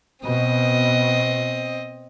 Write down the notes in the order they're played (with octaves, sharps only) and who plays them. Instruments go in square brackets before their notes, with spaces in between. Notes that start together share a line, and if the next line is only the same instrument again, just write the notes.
[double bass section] B2 [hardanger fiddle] C4 D#5